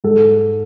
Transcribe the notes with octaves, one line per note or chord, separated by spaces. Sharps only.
G#2 A4